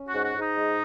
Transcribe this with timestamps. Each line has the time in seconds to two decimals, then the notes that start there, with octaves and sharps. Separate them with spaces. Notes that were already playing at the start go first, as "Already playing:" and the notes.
Already playing: C#4
0.09 G#2 F#4
0.24 F#4
0.35 G#2 D#4
0.57 G#3